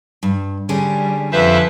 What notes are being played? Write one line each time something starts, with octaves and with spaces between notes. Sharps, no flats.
G2
D3 G3 C#4 G#4
F2 B4 C5 E5